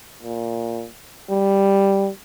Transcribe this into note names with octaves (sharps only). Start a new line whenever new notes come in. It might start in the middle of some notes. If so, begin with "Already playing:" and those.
A#2
G3